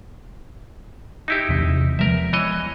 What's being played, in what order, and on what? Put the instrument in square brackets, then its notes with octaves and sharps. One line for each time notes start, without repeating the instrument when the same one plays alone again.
[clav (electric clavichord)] D#4 E4 G4
[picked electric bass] E2 C3
[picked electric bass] F3 G#3 B3 [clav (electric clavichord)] A#4 E5
[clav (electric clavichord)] E3 C#5 D#5